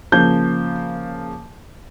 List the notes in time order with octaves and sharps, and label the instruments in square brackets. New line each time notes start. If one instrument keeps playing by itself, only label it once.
[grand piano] C#3 F3 A#3 G6